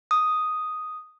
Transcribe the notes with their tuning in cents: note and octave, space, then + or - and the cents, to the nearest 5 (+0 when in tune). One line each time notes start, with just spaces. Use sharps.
D#6 +0